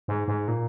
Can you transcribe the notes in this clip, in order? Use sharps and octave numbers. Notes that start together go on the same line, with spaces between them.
G#2
G#2
A#2